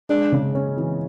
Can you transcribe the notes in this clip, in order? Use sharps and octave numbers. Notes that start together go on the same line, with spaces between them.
G#3 D4
C#3
C#4
E3